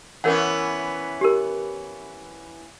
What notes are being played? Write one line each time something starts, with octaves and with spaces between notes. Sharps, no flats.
E3 B3 C#4 A#4 C#5 F#5
G4 A#4